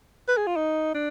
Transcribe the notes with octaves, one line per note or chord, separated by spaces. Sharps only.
B4
G#4
F4
D#4
D4